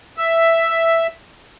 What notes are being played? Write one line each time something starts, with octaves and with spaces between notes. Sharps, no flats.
E5